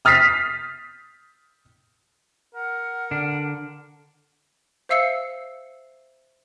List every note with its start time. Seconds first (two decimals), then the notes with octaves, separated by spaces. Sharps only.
0.05 D#6 F6 A6 B6 C7
2.54 A#4 F#5
3.11 D3 D4
4.89 C5 E5 F5 E6 C7 C#7